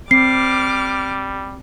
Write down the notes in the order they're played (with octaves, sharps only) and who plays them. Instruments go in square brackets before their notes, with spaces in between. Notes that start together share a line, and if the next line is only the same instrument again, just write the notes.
[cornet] G3 [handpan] C4 [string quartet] D6 F6 [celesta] C7